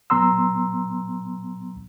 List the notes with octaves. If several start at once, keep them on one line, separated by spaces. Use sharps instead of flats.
A#2 F#3 B3 A#5 C6 E6